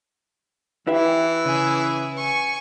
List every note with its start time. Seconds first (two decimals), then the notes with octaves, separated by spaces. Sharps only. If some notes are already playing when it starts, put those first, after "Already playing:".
0.87 E3 E4 G4 B4 E5
1.45 C#3 G#4 E5
2.17 G#5 C#6